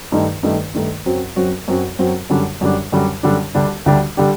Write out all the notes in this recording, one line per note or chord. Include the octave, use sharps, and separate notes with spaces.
G2 D#3 A3 D#4
G2 D#3 A3 D#4
G2 D#3 A3 D#4
F#2 F#3 C4 F#4
F#2 F#3 C4 F#4
F#2 F#3 C4 F#4
F#2 F#3 C4 F#4
F#2 D3 G3 D4
F#2 D3 G3 D4
F#2 D3 G3 D4
F#2 D3 G3 D4
D2 D3 G3 D4 G4
D2 D3 G3 D4 G4
D3 G3 D4 G4